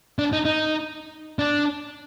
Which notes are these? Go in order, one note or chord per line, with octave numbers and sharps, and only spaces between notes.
D4
D#4
D#4
D4